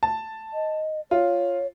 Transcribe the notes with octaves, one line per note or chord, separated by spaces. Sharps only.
A5
D#5
F4 C#5